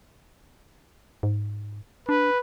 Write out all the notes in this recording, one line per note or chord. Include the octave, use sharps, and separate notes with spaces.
G#2
D4 B4